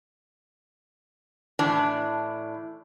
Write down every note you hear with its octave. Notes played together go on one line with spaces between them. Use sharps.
A2 E3 D4 A5